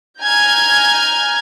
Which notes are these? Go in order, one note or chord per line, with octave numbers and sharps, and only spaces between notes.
G#5 A#5 F6 G6 G#6